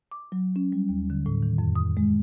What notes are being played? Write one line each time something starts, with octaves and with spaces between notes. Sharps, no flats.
D6
F#3
C#4
G3
D#2
D3
A2
D#3
F2
D#6
G#3